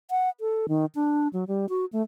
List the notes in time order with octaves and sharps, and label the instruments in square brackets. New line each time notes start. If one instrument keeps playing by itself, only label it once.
[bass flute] F#5
A4
D#3
D4
F#3
G3
F#4
A3